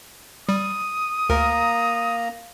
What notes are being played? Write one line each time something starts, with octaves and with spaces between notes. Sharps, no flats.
G3 D#6
D2 A#3 A#4 A#5